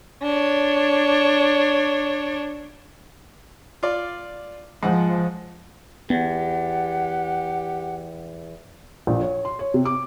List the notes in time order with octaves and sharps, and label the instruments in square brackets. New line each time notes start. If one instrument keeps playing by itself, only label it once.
[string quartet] D4 C#5
[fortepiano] F4 D5
[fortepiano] G#2 F#5 [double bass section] F3
[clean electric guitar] E2 [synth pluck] B3 [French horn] G4 [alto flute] F#5
[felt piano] A#1
C#5
C6
C#5
C3
D6